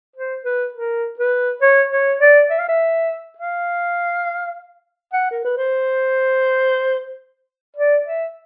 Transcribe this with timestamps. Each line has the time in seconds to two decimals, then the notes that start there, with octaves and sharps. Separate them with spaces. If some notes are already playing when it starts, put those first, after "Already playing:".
0.16 C5
0.45 B4
0.75 A#4
1.20 B4
1.62 C#5
1.93 C#5
2.21 D5
2.51 E5
2.59 F5
2.69 E5
3.38 F5
5.13 F#5
5.31 A#4
5.45 B4
5.58 C5
7.77 D5
8.06 E5